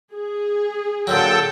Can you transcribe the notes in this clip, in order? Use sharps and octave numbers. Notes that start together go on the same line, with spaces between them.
G#4
A#2 D3 F#3 A4 G5